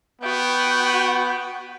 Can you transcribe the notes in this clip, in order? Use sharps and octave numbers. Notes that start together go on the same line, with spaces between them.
B3 F#4 G5